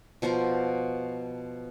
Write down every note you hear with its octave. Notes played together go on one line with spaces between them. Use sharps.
B2 F3 A#4 C5